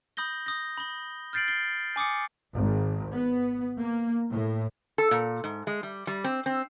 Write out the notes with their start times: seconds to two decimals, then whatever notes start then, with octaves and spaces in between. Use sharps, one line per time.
0.17 B5 D#6 G6 A#6 G7
0.46 D#6 A#6
0.78 B5 G7
1.33 F6 G6 A6 C7 D7 F#7
1.48 C7 G7
1.96 G#5 D6 D#6 C#7
2.54 G#1
3.13 B3
3.81 A#3
4.31 A2
4.98 A4
5.11 A#2
5.44 G#2
5.67 G#3
5.83 G3
6.07 G3
6.24 C4
6.46 C4